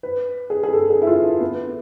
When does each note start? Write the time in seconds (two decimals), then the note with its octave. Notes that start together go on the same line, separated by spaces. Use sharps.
0.03 B4
0.50 G#4
0.63 G#4
0.73 A4
0.90 G#4
1.02 E4
1.07 F4
1.40 B3